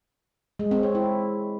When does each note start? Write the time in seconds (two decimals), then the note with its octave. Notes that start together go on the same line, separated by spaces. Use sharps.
0.59 G#3
0.71 C4
0.83 C#5
0.95 E4